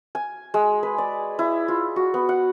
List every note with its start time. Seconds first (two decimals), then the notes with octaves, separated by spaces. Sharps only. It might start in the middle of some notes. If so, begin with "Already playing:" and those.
0.15 G#5
0.54 G#3
0.83 B4
0.98 D5
1.39 E4
1.68 F4
1.96 F#4
2.14 B3
2.29 F#5